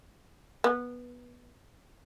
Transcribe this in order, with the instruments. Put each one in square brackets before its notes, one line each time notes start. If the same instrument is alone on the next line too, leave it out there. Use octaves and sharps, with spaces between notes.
[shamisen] B3